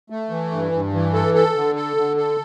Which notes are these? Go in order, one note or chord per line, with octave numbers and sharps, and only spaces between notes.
A3
E3
G2
G2
E3
A4
A4
D3
A4
D3
A4